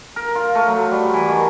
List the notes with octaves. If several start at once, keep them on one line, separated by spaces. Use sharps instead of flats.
A#4
F4
A3
F#3
G3
E3
D#3